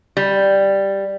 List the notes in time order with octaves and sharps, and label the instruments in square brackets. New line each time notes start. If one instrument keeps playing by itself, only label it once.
[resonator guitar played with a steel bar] G3